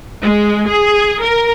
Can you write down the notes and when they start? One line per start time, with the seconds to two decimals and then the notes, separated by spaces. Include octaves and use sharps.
0.23 G#3
0.68 G#4
1.23 A#4